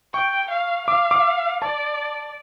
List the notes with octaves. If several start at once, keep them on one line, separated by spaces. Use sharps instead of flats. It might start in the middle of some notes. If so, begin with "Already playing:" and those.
G5 C#6
F5
F5 D6
D6
D5 A5